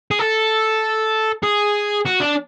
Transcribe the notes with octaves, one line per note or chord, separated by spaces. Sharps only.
G#4
A4
G#4
F#4
D4